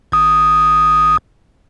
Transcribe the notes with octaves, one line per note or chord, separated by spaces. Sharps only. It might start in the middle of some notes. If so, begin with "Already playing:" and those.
G#1 D#6